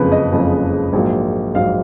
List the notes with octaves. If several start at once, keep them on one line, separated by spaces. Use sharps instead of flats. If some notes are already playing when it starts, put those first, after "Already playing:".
Already playing: F#1 F2 C#3 F3 G#3 B4
D#5
F#1 F2 C#3 F3 G#3
A#1 G#2 F#3 A#3
A#1 G#2 F#3 A#3 F5